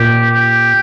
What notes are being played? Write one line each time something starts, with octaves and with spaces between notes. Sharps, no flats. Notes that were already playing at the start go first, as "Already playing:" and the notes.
Already playing: A#2 G4
G4